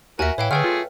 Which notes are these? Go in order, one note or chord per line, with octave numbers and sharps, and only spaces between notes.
D#2 F#4 A#4 E5 G#5
A2 E3 C#5 F5 G5
D3 A3 G#4 B4 G5 F6
F4